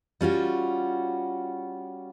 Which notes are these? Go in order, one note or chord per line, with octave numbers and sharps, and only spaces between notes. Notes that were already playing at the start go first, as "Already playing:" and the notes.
G3 C#4 F4 F#4